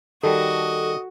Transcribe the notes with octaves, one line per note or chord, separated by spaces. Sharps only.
D#3 G3 F#4 A4 D#5